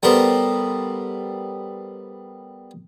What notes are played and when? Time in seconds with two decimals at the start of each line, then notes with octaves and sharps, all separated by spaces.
0.03 G3 B3 A4 A#4 C5